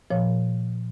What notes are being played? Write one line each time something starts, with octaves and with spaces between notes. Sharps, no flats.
A#2 F3 C#5